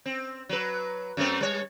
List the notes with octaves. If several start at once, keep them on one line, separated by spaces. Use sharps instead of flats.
C4
F#3 B4
F#2 A3 C4
G3 C#5